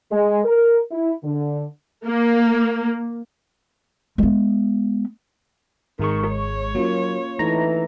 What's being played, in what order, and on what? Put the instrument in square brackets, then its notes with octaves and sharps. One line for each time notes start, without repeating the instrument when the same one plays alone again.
[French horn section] G#3
A#4
E4
D3
[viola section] A#3
[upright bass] G#3 B3
[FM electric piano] G#1 G#3 C#6 [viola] D#3
[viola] C#5
[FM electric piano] F#3 [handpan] A#3 C#4 F4
[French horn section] E3 [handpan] A3 D#4 A4 [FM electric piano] A#5